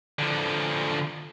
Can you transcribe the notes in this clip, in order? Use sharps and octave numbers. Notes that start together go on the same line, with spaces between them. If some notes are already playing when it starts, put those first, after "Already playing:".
D3 F3